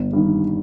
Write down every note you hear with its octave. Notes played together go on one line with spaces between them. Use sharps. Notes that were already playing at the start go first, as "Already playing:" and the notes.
Already playing: G1
G2 D#3